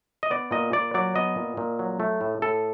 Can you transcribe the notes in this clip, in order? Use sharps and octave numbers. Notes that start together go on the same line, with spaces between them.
D#5
B3 D5
A#2 D#5
A#2 D5
F#3 D5
B3 D#5
A#2
A#2
F#3
A3
A2
A2 A4